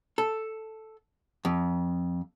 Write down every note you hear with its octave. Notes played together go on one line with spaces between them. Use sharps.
A4
F2